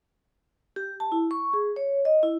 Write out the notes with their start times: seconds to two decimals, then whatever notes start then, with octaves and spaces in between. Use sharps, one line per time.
0.76 G4
1.00 A5
1.12 E4
1.31 C#6
1.53 G#4
1.76 C#5
2.05 D#5
2.23 E4